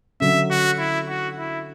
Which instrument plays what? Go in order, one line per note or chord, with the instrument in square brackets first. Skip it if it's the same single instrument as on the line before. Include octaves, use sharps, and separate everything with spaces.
[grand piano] D3 F#3 C#4 [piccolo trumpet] E5
[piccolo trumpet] F#4
E4
F#4
E4